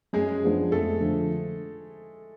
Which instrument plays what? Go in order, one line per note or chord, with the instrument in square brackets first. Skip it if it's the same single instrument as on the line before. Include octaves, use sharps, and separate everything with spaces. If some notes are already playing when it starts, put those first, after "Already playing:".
[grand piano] F#2 [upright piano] G#3 G#4
[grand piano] F3 G#3 B3 D4
[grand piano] F2 [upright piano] A3 A4
[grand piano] D3 F3